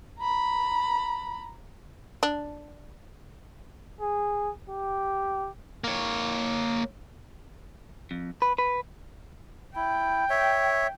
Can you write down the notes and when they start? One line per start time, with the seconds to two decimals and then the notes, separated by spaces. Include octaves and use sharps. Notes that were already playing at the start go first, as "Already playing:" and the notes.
0.20 A#5 B5
2.23 D4
4.01 G#4
4.70 G4
5.84 A#3 C#5
8.11 F2
8.42 B4
8.58 B4
9.76 E4 G5
10.30 C#5 E5